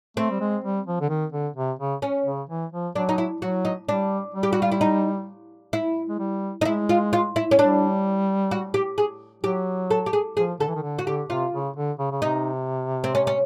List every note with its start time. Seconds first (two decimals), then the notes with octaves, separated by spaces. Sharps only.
0.17 A3 C4
0.31 G3
0.41 G#3
0.64 G3
0.87 F3
1.01 D3
1.09 D#3
1.33 D3
1.56 C3
1.79 C#3
2.02 C#4
2.26 C#3
2.49 E3
2.73 F3
2.95 F#3 D4
3.09 D#4
3.18 E4
3.41 F#3 F#4
3.65 D#4
3.87 G3 D4
4.35 G3
4.43 G4
4.53 F#4
4.62 F4
4.72 E4
4.81 D#4
5.73 E4
6.09 G#3
6.20 G3
6.61 D#4
6.65 G#3 E4
6.89 F4
7.13 F4
7.36 E4
7.51 C#4
7.58 G3 D4
8.51 F#4
8.74 G4
8.98 G#4
9.44 F#3 G4
9.91 A4
10.06 G4
10.13 G#4
10.37 F3 G#4
10.60 D3 A4
10.68 E3
10.76 D#3
10.83 D3
10.99 F#4
11.06 D3 G4
11.29 C3 F4
11.53 C#3
11.76 D3
11.99 C#3
12.12 C#3
12.22 C3 D#4
13.04 C4
13.15 C#4
13.27 C#4